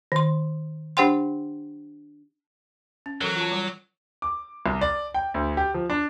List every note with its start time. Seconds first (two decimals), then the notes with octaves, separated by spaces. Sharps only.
0.12 D#3 C6
0.97 D4 G4 C5 F#5 G5 C6
3.06 C#4
3.21 E3 F#3 A4 A#4
3.36 F4 A5
3.52 G3
4.22 D6
4.66 C2
4.81 D5
5.14 G5
5.34 D2
5.57 G4
5.74 F3
5.90 D4